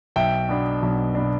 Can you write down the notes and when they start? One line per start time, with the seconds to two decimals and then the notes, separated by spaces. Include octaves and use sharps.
0.16 B1 E5 G5
0.49 B2 B3 D4
0.82 B1
1.15 B2 B3 D4